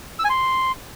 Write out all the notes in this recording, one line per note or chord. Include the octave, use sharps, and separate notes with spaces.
E6
G#5
C6